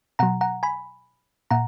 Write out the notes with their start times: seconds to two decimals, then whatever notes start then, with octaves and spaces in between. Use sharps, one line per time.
0.19 B2 F#3 F#5 A#5
0.41 F#5 A#5
0.63 G#5 B5
1.51 A#2 F#5 A#5